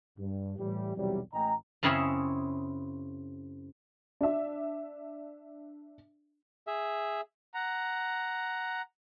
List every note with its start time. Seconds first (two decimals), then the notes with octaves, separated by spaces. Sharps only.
0.19 G2
0.59 A2 E3 G3 G4
0.96 B1 E2 C3 F#3 G3
1.33 A1 A3 D#5 G5 G#5 A#5
1.83 F#2 C#3 C4 E4 G#4 C#5
4.21 D4 E5
6.67 G#4 E5
7.54 F#5 A#5